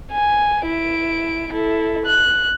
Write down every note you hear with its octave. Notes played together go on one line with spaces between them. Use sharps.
G#5
E4 D7
E4 A4
F#6